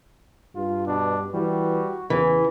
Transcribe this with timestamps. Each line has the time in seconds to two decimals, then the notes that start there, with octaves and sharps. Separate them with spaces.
0.56 G2 F4
0.87 B2 D4
1.34 E3 G3 F#4
2.10 E2 C#3 E3